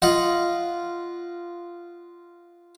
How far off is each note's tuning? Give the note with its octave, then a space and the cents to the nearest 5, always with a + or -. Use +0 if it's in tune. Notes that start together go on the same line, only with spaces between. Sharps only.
F4 -10 D#5 +0 F#5 -5